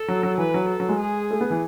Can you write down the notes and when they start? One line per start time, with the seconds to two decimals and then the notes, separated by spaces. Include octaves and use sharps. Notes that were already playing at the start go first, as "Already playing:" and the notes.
Already playing: A4
0.08 F#3
0.23 F#3
0.38 E3 B4
0.54 F#3
0.69 A4
0.80 F#3
0.89 G#3
1.00 G#4
1.31 A3
1.41 B3
1.50 E3